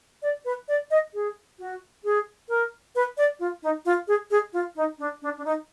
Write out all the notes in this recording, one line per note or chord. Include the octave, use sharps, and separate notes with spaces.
D5
B4
D5
D#5
G#4
F#4
G#4
A#4
B4
D5
F4
D#4
F4
G#4
G#4
F4
D#4
D4
D4
D4
D#4